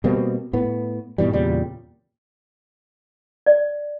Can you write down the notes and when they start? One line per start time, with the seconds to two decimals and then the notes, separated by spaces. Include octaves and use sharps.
0.04 B2 G3 A#3 C4
0.53 A2 B3
1.18 G#2 B2 E3 G3
1.33 E2 A#2 C#3 G3
3.46 D5